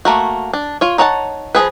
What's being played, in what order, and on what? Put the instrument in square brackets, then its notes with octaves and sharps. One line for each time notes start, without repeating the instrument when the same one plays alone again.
[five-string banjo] A3 A#3 F#4
D4
F4 C#5
D#4 C#5 F#5 G#5 A5
F3 C4 G#4 B4